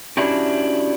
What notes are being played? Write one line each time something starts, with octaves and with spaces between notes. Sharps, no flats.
C#4 D4 E4 F#4 G4